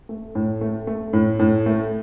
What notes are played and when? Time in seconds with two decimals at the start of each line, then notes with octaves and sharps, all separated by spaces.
0.09 A3
0.35 A2
0.61 A3
0.87 A3
1.13 A2
1.39 A2
1.66 A3